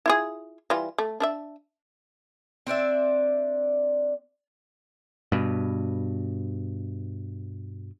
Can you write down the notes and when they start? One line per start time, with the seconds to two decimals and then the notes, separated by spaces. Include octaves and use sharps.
0.06 E4 F4 G#4
0.70 E3 G3 F4
0.98 A3
1.20 D4 A#4 E5
2.67 C4 D4 D5 E5
5.32 G2 B2